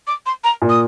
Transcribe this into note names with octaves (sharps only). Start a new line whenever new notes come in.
D6
C6
A#5
A#2
D#6